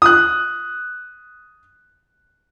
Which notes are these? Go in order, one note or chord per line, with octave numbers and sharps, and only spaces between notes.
D#6 F#6